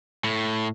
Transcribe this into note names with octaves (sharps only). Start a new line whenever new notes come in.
A2